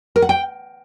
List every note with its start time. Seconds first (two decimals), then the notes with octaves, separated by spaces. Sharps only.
0.16 A#4
0.22 F#5
0.29 G5